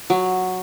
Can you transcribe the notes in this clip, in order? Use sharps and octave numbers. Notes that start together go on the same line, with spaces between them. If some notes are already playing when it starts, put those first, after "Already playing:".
F#3